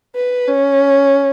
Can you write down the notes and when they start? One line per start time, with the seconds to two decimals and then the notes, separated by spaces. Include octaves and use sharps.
0.16 B4
0.48 C#4